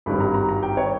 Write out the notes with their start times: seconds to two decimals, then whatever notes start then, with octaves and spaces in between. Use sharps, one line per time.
0.06 G#1 G2 D#3 G3 B5
0.20 A#5
0.34 A#5
0.49 A#5
0.63 G5
0.77 C#5